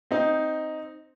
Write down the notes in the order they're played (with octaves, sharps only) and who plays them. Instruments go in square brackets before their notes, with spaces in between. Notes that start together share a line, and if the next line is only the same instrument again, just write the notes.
[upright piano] C4 D#4